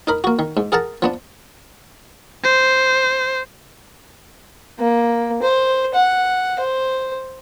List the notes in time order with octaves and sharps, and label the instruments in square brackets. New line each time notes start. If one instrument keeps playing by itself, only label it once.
[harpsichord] D#4 A#4 B5
A#3 F#4
D#3
G#2
G#4 A#4 F#5 A5 A#5
F3 B3 D4
[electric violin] C5
[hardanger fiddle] A#3
C5
F#5
C5